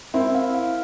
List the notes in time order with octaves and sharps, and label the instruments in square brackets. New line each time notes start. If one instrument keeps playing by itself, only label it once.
[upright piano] C4 E4 [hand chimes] A#4
[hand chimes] F5
F5